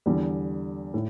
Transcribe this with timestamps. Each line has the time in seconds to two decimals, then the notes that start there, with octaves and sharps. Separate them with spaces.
0.06 E2 D3 G3
0.94 A2